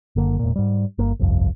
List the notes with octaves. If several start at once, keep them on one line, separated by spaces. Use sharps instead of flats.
F#1 D3 A#3
E1 A#2
G#2 G3
G1 A#3
G1 C2 F2